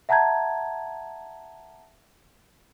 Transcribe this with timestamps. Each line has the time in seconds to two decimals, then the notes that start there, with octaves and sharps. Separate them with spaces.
0.09 E5 F#5 A5 A#5 G6 G#6